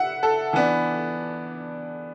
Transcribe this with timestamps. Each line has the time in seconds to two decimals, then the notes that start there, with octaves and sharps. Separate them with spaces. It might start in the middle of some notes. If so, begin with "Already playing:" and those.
Already playing: E5 F#5
0.23 A4
0.53 E3 B3 D4